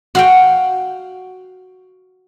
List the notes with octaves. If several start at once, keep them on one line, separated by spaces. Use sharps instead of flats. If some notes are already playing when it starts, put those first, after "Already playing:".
F#4 F5 G5